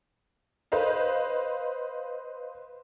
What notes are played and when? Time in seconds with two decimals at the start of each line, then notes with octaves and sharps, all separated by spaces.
0.72 B4 C5 D#5 F5